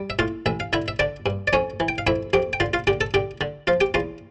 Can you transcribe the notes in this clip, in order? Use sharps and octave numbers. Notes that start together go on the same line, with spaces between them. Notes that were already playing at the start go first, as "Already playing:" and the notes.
Already playing: G3
E5
A2 F4 F5
A1 E5
F5
D3 E4 E5
E5
D3 D4 D5
G2
D5
F2 C#4 C#5
E3
G5
F5
F2 E4 E5
F2 G4 G5
G5
D3 F4 F5
F4 F5
D3 G4 G5
A4 A5
D3 G4 G5
D3
F3 F4 F5
G4 G5
E2 F4 F5